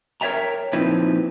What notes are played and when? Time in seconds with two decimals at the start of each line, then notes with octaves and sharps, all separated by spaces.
0.21 A#4 C#5 D5 E5 G5 A#5
0.73 A#2 F3 C4 D#4 E4 B4